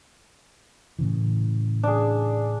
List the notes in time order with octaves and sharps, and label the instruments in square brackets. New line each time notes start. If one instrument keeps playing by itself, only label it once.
[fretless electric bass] A2 C#3 E3
[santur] D4 G#4